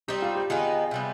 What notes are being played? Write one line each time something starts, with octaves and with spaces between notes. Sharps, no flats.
G3 C4 D#4 G4
F4
G4
D#3 B3 D#4 F4 G#4
C3 G3 B3